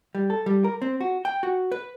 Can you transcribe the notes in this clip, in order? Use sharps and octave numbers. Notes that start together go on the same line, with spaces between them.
G3
A4
G3
A#4
C4
F#4
G5
F#4
B4